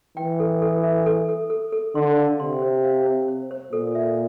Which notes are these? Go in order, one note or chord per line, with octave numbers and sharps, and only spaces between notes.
E3 G5
A4
A4
E5
A4
A4
A4
A4
D3 C6
F5
C3 C6
C5
F5
C5
C5
C5
A#2 A4
E5